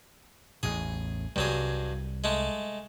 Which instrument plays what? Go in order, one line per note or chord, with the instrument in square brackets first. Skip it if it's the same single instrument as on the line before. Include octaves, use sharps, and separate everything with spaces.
[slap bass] A1 E2 A2 [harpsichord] G#4
[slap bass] C2 G3 [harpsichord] G2 F#3 G#4
[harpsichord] G#3 A3